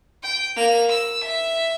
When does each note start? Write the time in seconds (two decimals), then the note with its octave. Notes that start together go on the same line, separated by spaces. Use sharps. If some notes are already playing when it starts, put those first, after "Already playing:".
0.23 G5
0.56 A#3 F7
0.89 E6
1.25 E5